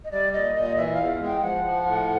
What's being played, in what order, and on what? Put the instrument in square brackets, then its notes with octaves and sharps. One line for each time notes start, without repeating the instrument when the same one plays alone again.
[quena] D#5
[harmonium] G3 [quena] D5
[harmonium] A#2 [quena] D#5
[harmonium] A#2 [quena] D#5
[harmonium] E3 [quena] E5
[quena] F5
[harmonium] E2
G#3
[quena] G5
[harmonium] F3 [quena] F#5
[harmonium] F3
A2